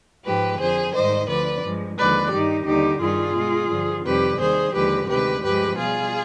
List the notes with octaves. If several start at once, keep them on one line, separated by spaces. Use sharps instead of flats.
G#2 F3 G#3 G4 B4
F2 D3 F3 G#4 C5
G#2 D#3 G3 C5 D#5
D2 D3 F3 B4 D5
G2 F3 G#3
D#2 D3 F3 G#3 B4 D5
G2 D#3 G3 D#4 G4
D#2 D3 G3 D#4 G4
G2 D#3 G3 F4 G#4
B2 G#3
G2 D3 F3
F2 C3 D#3 G3 G4 B4
D#2 D#3 G3 G#4 C5
D#2 D3 F3 G#3 G4 B4
D2 C3 D#3 G#3 G4 B4
G2 F3 G#3 G4 B4
B2 G3 F4 G#4